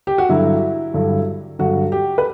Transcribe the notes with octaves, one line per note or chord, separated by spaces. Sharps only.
G4
F#4
G2 D3 F#3 E4
G2 D3 F#3
G2 D3 F#3 F#4
G4
B4